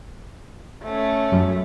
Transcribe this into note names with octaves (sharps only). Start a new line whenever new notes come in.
A3 C#4
F#2